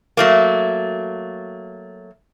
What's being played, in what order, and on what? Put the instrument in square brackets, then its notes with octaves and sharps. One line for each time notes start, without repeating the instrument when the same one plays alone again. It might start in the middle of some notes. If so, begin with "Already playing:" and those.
[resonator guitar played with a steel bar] F#3 A3 A#3